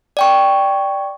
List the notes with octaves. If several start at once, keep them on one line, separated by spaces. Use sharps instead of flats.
D5 G5 C#6